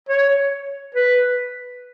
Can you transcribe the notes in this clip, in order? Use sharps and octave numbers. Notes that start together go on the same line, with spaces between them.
C#5
B4